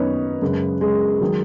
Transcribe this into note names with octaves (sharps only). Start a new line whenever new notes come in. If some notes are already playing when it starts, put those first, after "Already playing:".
Already playing: F#2 D#3 F#3 B3 C#4 D#4 B4 C#5
F#2 C#3 G#3
G#3 G#4
D#3 F#3